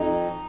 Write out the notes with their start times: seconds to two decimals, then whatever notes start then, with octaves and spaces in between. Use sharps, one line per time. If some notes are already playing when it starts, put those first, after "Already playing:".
Already playing: F2 D#4